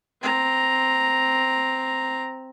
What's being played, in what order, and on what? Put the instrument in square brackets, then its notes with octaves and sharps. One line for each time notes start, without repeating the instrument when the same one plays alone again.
[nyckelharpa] C4 A#5